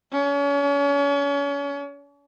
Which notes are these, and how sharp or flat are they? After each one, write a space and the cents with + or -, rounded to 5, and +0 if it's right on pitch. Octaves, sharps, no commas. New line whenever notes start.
C#4 +35